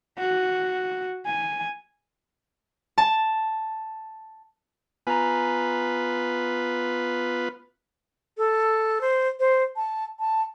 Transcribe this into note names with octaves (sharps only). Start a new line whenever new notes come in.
F#4
G#5
A5
B3 F4 B4 G#5 A#5
A4
C5
C5
A5
A5